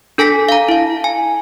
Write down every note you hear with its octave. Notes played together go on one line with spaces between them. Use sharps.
D4 A4 G#5 A#6 B6
F5 A#5
E4 F5
G#5